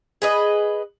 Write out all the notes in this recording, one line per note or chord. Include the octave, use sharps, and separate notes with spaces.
G#4 B4 D#5